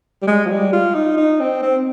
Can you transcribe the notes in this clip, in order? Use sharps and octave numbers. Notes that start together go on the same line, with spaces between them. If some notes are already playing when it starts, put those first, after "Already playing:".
G3
G#3
F3
G3
F4
D#4
D#4
C4
C4